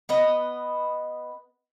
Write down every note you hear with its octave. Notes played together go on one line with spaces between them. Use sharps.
B3 B4 D#5